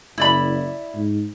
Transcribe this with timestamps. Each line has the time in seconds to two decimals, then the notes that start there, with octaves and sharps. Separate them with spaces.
0.18 F#1 E4 D5 B5
0.95 G#2